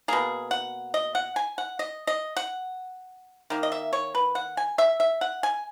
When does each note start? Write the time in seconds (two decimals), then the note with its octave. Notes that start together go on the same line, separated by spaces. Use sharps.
0.08 B2 A#3 G#4
0.51 F#5
0.94 D#5
1.15 F#5
1.36 G#5
1.58 F#5
1.79 D#5
2.07 D#5
2.37 F#5
3.50 D#3 A#3
3.63 D#5
3.72 E5
3.93 C#5
4.15 B4
4.35 F#5
4.57 G#5
4.78 E5
5.00 E5
5.21 F#5
5.43 G#5